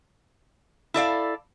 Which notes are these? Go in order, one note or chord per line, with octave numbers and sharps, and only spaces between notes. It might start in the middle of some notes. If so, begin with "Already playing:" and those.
E4 A4 D5 F5